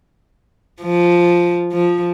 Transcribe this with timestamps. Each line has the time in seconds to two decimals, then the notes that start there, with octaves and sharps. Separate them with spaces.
0.82 F3
1.73 F3